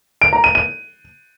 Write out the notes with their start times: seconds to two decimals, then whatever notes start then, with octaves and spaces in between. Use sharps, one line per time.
0.22 D7
0.33 A#5
0.44 D#7
0.55 D#7